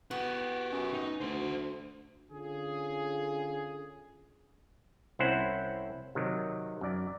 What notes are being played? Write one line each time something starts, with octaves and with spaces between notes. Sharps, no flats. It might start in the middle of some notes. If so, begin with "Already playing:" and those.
B3 F#4 G4
F#2
D#4
D2 F#4 C5
D3 C#4 F4 G#4
C2 C4 C#4 E4 C5 F#5
C3 D#3 F#3
F#2 D5